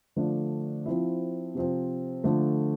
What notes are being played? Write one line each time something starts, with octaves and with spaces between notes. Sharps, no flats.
D3 F3 A3 D4
F3 C4 E4
C3 F3 C4
D3 F3 A3